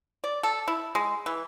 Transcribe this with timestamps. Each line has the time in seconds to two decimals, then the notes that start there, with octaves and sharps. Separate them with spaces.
0.24 D5
0.43 A4
0.68 E4
0.95 G#3
1.26 E3